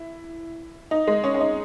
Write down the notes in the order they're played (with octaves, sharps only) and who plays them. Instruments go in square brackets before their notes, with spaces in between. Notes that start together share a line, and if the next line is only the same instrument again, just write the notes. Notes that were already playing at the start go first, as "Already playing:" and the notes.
Already playing: [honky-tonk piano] E4
D#4
G#3
C#4
C#4
D#4